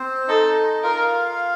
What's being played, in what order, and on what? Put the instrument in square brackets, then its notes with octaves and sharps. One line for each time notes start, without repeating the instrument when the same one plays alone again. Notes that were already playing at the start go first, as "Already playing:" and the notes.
Already playing: [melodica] C4 C5
[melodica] D#4 D#5 [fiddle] A4
[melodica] F4 F5 [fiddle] A#4